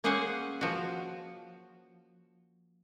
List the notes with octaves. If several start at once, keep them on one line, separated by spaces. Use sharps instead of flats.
A#3 C#4 G#4 C5 F#5 G#5
F3 F#4